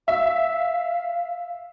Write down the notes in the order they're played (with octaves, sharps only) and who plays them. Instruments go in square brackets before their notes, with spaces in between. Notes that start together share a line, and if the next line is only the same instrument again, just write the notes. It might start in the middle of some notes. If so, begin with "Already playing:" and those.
[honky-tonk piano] E5 [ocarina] F5